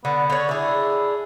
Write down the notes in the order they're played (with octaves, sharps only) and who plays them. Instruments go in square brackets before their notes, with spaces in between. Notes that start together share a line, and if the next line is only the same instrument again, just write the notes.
[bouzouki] D3 [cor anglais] B3
[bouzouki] D3 C#5
[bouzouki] D4 G#4 [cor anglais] E4